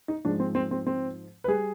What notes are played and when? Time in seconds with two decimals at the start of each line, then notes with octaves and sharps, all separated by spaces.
0.08 D#4
0.25 G#2 F3 G#3 D4
0.40 C4
0.55 C4
0.71 C4
0.87 C4
1.44 B4
1.48 G3 G#4